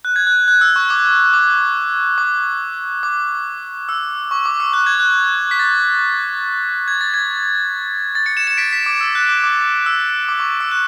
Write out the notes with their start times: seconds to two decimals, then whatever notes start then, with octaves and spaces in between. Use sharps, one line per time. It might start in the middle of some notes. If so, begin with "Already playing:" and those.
0.05 F#6
0.16 G#6
0.27 F#6
0.48 F#6
0.61 E6
0.76 C#6
0.90 D6
1.33 D6
2.18 D6
3.03 D6
3.89 E6
4.31 C#6
4.46 D6
4.60 E6
4.73 F#6
4.86 G#6
5.00 F#6
5.51 B6
5.59 A6
6.88 G#6
7.01 A6
7.14 G#6
8.15 A6
8.26 A6 C#7
8.37 C#7 E7
8.47 C#7 E7
8.57 B6 D7
8.73 B6
8.86 D6
9.01 E6
9.15 F#6
9.29 D6
9.44 D6
9.86 E6
10.29 D6
10.40 C#6
10.60 E6
10.71 F#6